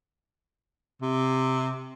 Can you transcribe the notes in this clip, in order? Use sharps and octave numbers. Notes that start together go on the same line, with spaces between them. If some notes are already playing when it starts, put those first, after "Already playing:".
C3